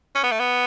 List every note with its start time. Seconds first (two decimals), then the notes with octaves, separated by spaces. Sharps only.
0.15 C#4
0.24 B3
0.32 A3
0.40 B3